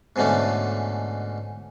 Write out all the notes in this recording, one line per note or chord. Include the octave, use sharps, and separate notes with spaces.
G#2 B2 D3 E3 A3 C#4